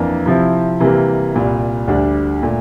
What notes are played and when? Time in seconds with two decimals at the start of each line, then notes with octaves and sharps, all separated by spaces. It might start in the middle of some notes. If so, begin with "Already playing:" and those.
Already playing: F2 E3 A#3 D4
0.26 C3 F3 C4 E4
0.80 C3 E3 G3 A#3
1.34 C2 A#2 G3
1.88 D2 D3 G3 D4
2.43 A#2 A3